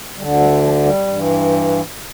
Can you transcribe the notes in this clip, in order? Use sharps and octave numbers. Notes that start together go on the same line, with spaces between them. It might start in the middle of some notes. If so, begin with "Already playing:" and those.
D2 D3 G3
G3
F3
G3
G2 E3